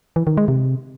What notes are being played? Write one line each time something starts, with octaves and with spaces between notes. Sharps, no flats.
E3
D#3
G#3
C3